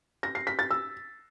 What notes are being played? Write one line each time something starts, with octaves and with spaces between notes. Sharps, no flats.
A#6
C7
B6
A6
E6